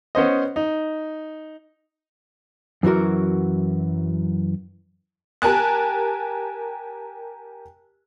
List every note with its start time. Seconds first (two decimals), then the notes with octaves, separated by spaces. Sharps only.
0.15 B3 C#4 C5 D#5
0.56 D#4
2.83 F#2 E3 F#3 F#4 A#4
5.42 G4 A#4 G#5 A5 F#6